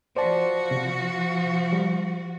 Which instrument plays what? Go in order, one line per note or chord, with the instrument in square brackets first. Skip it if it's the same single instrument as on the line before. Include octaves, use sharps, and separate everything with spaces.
[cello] F3 F#4 [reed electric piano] C5 D5 A5
[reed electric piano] C3
G3